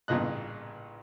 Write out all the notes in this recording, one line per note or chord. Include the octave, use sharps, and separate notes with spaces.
A1 G2 A#2 C#3 D#5 F#6